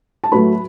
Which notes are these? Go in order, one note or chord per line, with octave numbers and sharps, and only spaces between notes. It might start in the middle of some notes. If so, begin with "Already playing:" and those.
A5
A2 F#3 A3 B4 B5